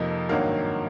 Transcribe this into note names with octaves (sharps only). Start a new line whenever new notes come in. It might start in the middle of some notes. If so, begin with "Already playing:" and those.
Already playing: F2 C3 F3 A#3 D#4
G#1 G2 D#3 F#3 A#3 F5